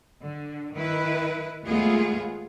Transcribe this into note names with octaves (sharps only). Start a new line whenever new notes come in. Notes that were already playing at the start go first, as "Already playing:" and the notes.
D3
D#3 E4 B4
D#2 G#3 A3 B3 F4 G#4